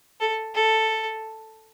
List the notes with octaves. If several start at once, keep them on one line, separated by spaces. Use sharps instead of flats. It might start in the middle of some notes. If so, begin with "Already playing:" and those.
A4
A4